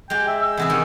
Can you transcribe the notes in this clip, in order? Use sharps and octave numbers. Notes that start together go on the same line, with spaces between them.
G#3 G4 G5
E5
E6
E2 C3 G#4
D#3 C#4